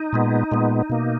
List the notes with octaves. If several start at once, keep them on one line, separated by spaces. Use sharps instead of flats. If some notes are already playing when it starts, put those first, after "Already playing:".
Already playing: D#4
A#2 G#3 B3
A#2 G#3 B3
B2 A#3